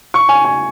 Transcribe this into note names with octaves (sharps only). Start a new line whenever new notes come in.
C#6
G#5
G#5